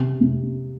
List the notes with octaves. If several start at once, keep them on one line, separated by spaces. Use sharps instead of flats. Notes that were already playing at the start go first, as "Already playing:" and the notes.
Already playing: C3
C3